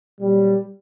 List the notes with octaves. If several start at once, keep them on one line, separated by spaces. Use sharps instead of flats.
A#2 F#3 G3